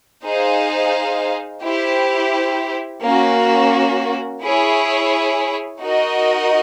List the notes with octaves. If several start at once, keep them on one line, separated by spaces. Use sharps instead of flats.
D#4 G#4 C5 F5
E4 G4 C5
A#3 C#4 F#4
E4 G#4 C#5
D#4 F#4 A#4 D#5